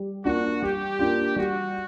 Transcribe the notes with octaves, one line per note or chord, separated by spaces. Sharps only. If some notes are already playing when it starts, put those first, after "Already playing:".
Already playing: G3
A#3 D4 F4 F#4
G3 G4
A#3 D4 F4
G3 F#4